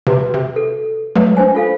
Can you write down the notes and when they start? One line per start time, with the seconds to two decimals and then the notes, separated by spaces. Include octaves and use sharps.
0.07 C3 F#4 B4 C6
0.34 C3
0.56 A4
1.16 F#3 G#3 A3 B4
1.37 D4 C5 G#5
1.55 F4 A4 F5